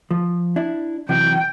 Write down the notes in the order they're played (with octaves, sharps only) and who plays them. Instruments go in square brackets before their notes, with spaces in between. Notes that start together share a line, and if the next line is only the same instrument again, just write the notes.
[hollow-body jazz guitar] F3
D4 E4
[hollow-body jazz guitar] C3 E3 F#3 [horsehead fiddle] G5